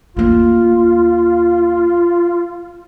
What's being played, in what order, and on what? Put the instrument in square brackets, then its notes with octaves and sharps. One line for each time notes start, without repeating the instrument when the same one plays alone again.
[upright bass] D#2 A#3 [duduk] F4